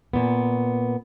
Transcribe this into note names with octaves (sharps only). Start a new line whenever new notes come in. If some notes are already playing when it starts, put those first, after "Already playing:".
A#2 B3